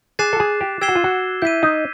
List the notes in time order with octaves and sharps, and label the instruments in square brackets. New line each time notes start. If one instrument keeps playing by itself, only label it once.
[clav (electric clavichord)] G#4 [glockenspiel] D6 F#6 A6 C7 E7
[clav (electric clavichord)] A4
G#4
G4
[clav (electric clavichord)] G4 [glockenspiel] E6 G#6 C7 E7 G7
[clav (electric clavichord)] F#4
F4
F#4
[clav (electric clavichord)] E4 [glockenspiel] G6 B6 D#7
[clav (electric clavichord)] D#4